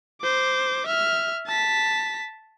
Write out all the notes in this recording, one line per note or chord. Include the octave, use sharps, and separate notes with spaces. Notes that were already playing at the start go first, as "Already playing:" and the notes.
C5 D6
E5 F6
A5 B6